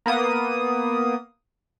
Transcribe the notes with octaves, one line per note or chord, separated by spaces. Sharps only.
A#3 B3 D#6